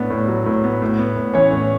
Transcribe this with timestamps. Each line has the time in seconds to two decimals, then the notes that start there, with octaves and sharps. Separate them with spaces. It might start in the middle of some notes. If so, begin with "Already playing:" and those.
Already playing: A2 B3 D4
0.10 A2
0.28 F#3
0.46 A2
0.64 B3
0.82 A2
0.99 B3
1.17 A2
1.34 E3 C#4 C#5
1.52 A2